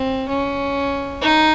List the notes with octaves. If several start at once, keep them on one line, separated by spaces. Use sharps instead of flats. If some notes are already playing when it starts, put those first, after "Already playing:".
Already playing: C4
C#4
D#4